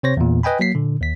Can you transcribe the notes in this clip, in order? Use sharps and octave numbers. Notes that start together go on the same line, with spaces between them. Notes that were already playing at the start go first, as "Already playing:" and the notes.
C3 C4 C5 C#5 A#6
E2 A#2
B4 D#5 G5 G#5 B5
F#3 A#3 B6 C7
A#2 D3
D#2 B6